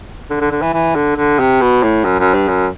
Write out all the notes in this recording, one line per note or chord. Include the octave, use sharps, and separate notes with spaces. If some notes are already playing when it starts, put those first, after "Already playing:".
D3
D3
D3
E3
E3
D3
D3
C3
B2
A2
F#2
F#2
G2
F#2